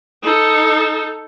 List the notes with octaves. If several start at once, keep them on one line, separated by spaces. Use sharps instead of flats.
D#4 A4